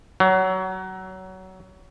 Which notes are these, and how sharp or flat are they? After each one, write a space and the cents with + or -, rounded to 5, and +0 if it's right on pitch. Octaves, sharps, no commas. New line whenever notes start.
F#3 +20